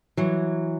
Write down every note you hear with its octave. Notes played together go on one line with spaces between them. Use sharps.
E3 F#3